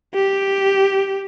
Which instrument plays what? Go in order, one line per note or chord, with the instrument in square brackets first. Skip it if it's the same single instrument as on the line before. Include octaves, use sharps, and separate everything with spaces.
[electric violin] G4